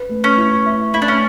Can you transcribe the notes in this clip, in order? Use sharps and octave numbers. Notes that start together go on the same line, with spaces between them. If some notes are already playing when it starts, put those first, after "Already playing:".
Already playing: B4
A3
C#4
E4
E5
A3 E4
D4
C#4